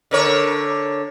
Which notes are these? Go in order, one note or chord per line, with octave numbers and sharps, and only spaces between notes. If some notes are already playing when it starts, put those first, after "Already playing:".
D3 A#4 C#5